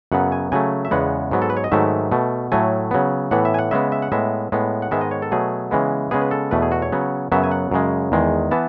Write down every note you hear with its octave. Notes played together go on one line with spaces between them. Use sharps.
F#2 C#3 F#3 B3 F#5
G#5
C#3 F#3 A3 G#5
E5
E2 C#3 G#3 B3 F#5
G#2 F#3 B3
A4
B4
C#5
D#5
G#2 D#3 F#3 A3 E5
B2 A3
A2 F#3 A3 G#5
C#3 F#3 B3
A2 E3 B3 F#5
E5
G#5
F#5
C#3 G#3 B3 E5
E5
F#5
A2 G#3 B3 E5
A2 G#3 B3
F#5
G#2 D#3 G#3 B3 E5
D#5
C#5
A4
B2 F#3 A3 G#4
C#3 E3 G#3 B3
C#3 G#3 B3 G#4
B4
A4
E2 B2 A3 B4
G#4
F#4
C#5
C#3 F#3 B3
F#2 C#3 F#3 B3 E5
G#5
F#5
F#2 C#3 G#3
E2 D#3 G#3
E3 B3 A5